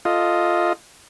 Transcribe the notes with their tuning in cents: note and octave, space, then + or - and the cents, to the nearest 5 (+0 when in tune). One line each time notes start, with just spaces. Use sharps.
F4 +0 A4 +0 D#5 +0